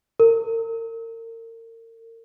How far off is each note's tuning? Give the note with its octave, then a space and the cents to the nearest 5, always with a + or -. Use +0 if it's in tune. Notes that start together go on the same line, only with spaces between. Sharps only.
A#4 -35